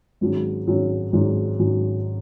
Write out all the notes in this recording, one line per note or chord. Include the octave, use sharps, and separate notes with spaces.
G#1 G#2 F#3 C#4
G#1 G#2 F#3 C#4
G#1 G#2 F#3 C#4
G#1 G#2 F#3 C#4